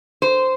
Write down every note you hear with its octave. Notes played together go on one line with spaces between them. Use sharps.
C5